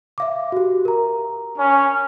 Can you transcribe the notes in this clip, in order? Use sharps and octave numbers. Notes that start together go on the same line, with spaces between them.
E5 F5 D6
F#4 G4
A#4 A#5
C#4